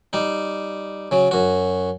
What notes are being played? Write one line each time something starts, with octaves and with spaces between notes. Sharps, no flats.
G3 D#4
C#3 F#3
F#2 F#4